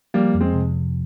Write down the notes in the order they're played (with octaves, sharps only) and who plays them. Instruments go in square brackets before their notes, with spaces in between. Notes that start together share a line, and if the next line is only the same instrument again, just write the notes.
[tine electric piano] F3 [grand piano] G3 A#3
[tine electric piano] F2
[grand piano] G#3 C4
[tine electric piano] C3